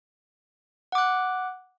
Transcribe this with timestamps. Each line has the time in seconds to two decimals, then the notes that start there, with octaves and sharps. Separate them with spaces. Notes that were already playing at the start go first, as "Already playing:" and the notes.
0.92 F#5
0.95 D6
0.98 F#6